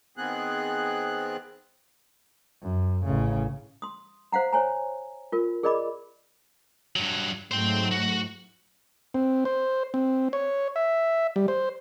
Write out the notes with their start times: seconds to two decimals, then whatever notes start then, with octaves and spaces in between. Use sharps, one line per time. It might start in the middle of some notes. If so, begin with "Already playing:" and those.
0.17 D#3 B3 C4 G#4 F#6
2.62 F#2
3.05 A1 C#3
3.82 C6 D#6
4.32 C5 F5 F#5 A#5
4.53 C5 C#5 G#5 A#5
5.32 F4 A#4
5.63 G#4 A#4 D5 D#5 B5 D6
6.96 G2 F#3
7.51 G#2 F#3 A3 C5 G5
7.91 F#4
9.14 C4
9.45 C5
9.94 C4
10.33 C#5
10.76 E5
11.36 G3
11.48 C5